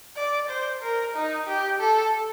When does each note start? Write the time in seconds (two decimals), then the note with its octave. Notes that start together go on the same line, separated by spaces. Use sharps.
0.17 D5
0.49 C5
0.81 A#4
1.15 D#4
1.47 G4
1.79 A4